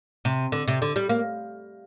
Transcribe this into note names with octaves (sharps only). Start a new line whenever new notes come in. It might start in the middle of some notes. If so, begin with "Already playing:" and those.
C3
D3
C3
D3
G3
A#3